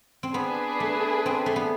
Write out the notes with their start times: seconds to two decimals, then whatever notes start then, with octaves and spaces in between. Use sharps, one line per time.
0.23 C4
0.34 B3 D4 G#4 B4
0.80 A3
1.26 C4
1.46 A3
1.56 B3